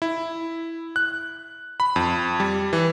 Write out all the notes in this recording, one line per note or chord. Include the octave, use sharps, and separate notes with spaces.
E4
F#6
B5
F2
G3
E3